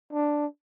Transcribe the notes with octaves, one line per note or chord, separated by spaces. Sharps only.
D4